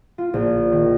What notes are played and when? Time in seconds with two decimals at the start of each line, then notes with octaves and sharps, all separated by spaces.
0.18 F4
0.34 A#1
0.72 D#3